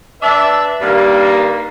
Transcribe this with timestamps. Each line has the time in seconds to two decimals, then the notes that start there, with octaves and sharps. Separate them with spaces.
0.22 D4 B4 D5 E5
0.81 G2 D#3 G3 A#3